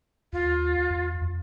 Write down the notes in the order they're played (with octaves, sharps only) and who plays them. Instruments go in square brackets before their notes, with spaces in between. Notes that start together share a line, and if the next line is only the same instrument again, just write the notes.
[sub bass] D#2 [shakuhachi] F4
[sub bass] E2
F2